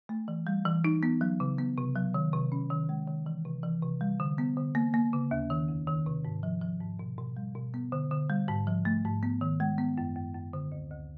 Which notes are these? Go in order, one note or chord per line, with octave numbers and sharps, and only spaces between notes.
A3
E3
G3
E3
D#4
B3
F#3
C#3
B3
C3
F#3
D#3
C3
C#4
D#3
G#3
D#3
E3
C3
E3
C3
G3
D3
B3
D3
A#3
A#3
C#3
D#2
D#3
F2
D#3
C3
G#2
F3
F3
G#2
B2
B2
G3
B2
B3
D3
D3
G3
G#2
F3
A3
G#2
B3
D#3
G#3
B3
F#2
F#2
F#2
D3
D2
D2